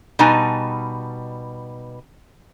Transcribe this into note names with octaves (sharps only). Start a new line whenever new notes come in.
B2 G3 D#4 G#5 A5